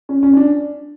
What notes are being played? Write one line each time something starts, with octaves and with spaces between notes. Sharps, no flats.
C#4
C#4
C#4
D4